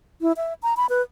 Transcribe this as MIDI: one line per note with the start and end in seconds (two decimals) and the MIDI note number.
0.21 0.32 64
0.37 0.54 76
0.63 0.74 82
0.77 0.86 83
0.89 1.02 71